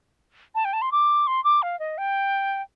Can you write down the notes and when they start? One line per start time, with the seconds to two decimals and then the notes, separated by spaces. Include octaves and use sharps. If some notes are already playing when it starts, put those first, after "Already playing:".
0.55 A5
0.65 G5
0.73 A5
0.82 C6
0.92 D6
1.27 C6
1.44 D6
1.62 F5
1.79 D#5
1.98 G5